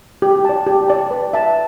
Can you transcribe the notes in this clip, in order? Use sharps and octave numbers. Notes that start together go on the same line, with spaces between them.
G4
D5 A5
G4
D5 A5
B4
E5 A5